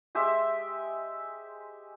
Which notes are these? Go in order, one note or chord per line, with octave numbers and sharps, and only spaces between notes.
G#3 G4 C5 E5